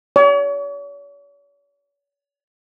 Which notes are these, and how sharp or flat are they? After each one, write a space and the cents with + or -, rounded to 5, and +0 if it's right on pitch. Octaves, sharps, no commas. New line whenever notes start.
C#5 +45